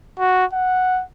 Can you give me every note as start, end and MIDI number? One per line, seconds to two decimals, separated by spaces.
0.19 0.45 66
0.53 1.02 78